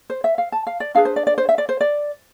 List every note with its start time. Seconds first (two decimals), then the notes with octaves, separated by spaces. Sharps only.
0.10 C5
0.24 E5
0.38 F5
0.52 A5
0.67 F5
0.80 D5
0.95 D4 G#4 B4 F5
1.05 C5
1.16 D5
1.27 D5
1.38 C5
1.49 E5
1.58 D5
1.69 C5
1.81 D5